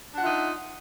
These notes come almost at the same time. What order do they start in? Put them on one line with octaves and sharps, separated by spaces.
D4 F#5 F4 E5 D#4